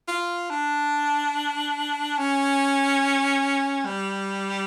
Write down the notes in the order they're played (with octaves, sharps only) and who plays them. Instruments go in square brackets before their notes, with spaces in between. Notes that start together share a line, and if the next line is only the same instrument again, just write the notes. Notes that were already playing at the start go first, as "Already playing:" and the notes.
[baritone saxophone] F4
D4
C#4
G3